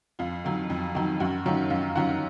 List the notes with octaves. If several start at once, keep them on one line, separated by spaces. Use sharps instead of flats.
F2 F4
D#3 F#3
F2
D#3 F#3
F#2 F#4
D#3 F#3 C#4 F4
F#2 F5
D#3 F#3 C#4 F4 F#5